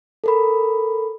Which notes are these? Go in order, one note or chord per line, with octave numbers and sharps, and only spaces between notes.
A4 A#4 B5